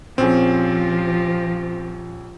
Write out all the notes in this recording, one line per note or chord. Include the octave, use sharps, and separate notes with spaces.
A#1 F3 C4 C#4 F4 G4 G#4